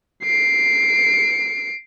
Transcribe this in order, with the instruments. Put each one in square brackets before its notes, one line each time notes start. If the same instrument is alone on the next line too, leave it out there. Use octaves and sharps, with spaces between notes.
[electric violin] C7 D7